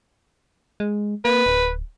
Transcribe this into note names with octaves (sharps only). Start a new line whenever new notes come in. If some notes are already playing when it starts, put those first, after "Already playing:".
G#3
A#3 B4
D1